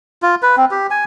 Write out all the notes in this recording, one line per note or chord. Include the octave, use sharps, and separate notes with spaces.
F4
B4
C4
G4
G#5